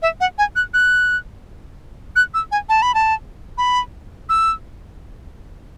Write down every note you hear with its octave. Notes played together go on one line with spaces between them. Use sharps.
E5
F#5
G#5
F#6
F#6
F#6
E6
G#5
A5
B5
A5
B5
E6